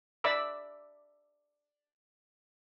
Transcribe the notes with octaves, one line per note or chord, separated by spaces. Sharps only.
D5 E5 B5 D6 E6